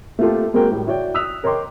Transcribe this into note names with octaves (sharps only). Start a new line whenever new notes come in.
A3 A#3 C4 F4 G4 A4
G#3 A#3 C4 F#4 A#4 G5
A2 G3
E4 F#4 C#5 D5 G5
D#6 E6 F#6 B6 F7
A#4 C#5 D#5 G5 C6 D6